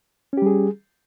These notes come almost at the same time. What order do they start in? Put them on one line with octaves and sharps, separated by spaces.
C#4 G4 G3 G#4